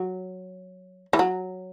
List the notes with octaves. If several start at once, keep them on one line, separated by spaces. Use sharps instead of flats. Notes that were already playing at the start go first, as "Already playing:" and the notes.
Already playing: F#3
E3
F#3